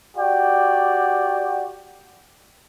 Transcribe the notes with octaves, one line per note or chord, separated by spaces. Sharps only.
F#4 G4 D5 G5